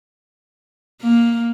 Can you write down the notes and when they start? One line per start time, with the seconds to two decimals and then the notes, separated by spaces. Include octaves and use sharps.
1.02 A#3